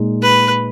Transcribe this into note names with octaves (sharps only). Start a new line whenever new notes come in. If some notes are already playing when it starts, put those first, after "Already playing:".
Already playing: A#2 G#3 D#4
B4